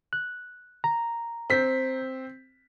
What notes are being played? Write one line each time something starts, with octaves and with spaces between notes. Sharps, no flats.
F#6
A#5
C4 B6